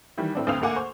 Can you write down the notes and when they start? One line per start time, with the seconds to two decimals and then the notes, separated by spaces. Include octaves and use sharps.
0.17 D#3 E3 G3
0.35 A2 C4 D4
0.47 D2 G2 C4 F5 D#6 F7
0.62 D2 A3 A#3 F#5 G#5 D6
0.76 C5 C#6